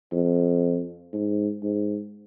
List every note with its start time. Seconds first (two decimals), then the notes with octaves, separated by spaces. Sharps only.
0.12 F2
1.13 G#2
1.63 G#2